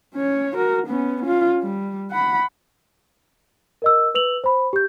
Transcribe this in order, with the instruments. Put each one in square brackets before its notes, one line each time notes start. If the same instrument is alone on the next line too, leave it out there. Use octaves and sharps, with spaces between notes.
[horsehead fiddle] C#4 C#5
F#4 A#4
B3 C#4
C#4 F4
G3
F#5 B5
[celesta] A#4 D#5 E6
B4 E6 F7 F#7
C5 B5
G4 G6